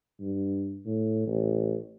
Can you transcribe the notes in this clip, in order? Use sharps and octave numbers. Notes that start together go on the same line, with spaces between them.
G2
A2
A1